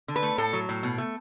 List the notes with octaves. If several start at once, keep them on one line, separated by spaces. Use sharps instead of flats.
D3
B4
A3
A2 A4
F#3
A2
B2
A3